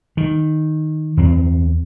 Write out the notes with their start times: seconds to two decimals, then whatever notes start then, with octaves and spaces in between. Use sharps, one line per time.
0.17 D#3
1.17 E2 C4